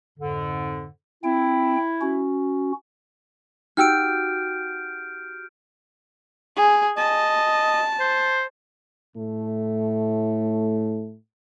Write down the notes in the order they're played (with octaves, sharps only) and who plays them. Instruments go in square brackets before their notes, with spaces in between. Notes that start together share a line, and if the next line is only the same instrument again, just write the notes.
[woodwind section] F2 G#2 D3
[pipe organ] C4 G5 [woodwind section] E4
[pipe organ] C#4 F#4
[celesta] D#4 G5 E6 [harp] F#4 G4 [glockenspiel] F6 G6 D7
[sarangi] G#4
[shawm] D#5 [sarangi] A5
[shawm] C5
[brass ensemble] A2 A3